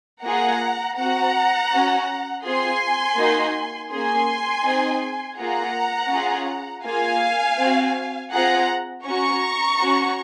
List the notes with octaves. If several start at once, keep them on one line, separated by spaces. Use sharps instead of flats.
A#3 F4 G#4 F#5 A#5
C4 F#4 F#5 A#5
C#4 F#4
C4 F4 G#4 G#5 C6
A#3 D#4 F#4
A#3 C#4 G#4 G#5 C6
C4 D#4 G#4
A#3 F4 G#4 F#5 A#5
C#4 F4 G#4
A#3 F4 G#4 F5 G#5
C4 F#4
C4 F4 G#4 F#5 A#5
C#4 F#4 A#5 C#6
C#4 F#4